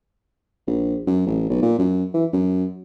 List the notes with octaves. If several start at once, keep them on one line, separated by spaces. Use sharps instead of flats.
A#1
F#2
A1
B1
A#2
F#2
E3
F#2